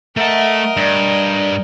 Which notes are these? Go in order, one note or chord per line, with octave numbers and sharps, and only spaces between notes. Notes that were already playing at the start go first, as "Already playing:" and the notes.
A3 A#4 D#5 E5 F#5 A5
G2 D5